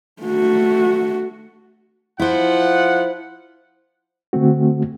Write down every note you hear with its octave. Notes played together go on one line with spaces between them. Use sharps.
A3 F#4
F3 E4 F4 C5 F#5
D3 A3 C4 F#4